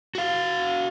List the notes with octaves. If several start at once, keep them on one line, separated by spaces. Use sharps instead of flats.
F#4 F5